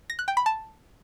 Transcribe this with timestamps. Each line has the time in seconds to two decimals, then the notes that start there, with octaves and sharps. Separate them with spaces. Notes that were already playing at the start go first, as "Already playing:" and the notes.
0.10 A#6
0.19 F#6
0.28 G5
0.37 B5
0.46 A5